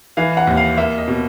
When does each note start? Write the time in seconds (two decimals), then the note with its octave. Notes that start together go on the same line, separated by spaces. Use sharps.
0.17 E3 F5
0.37 F#5
0.47 D#2
0.57 F5
0.77 A#3 E5
0.98 D#5
1.08 B2